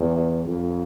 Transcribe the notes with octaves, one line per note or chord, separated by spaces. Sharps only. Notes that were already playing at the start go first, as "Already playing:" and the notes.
Already playing: E2
F2